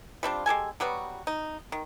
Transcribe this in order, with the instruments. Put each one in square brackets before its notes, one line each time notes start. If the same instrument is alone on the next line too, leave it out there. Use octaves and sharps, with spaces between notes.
[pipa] G3 C4 D4 F4
G#3 G4 A4 G#5
F#3 G3 B3 F#4
D#4
D#3